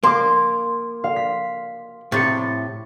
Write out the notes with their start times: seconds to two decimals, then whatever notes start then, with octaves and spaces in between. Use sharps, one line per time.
0.03 A#3 C6 D6
1.04 F5
1.16 B6
2.12 A2 C3 A6 C#7